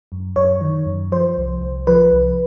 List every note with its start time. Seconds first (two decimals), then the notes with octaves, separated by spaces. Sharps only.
0.12 F#2
0.36 F#2 C#5
0.61 D#3
0.86 F#2
1.12 F3 C5
1.37 C2
1.62 C2
1.87 F3 B4
2.12 C2